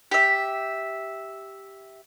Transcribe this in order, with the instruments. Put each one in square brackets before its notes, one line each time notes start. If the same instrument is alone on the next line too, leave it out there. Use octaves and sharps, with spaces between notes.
[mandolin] G4 E5